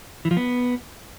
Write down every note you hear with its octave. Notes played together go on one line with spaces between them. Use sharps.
E3
F3
B3